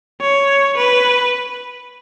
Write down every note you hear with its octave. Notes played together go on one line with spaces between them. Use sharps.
C#5
B4